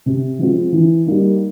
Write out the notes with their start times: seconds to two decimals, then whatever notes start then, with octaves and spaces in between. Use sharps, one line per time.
0.06 C3
0.39 F3 G#3 C4 F4
0.72 E3
1.06 G3 A#3 D#4